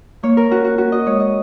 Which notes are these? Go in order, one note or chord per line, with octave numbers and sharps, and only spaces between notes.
A#3 C#5
A#4
C#4 F#4
F#4
C#4 F#4
D#5
G#3 C#5
D#5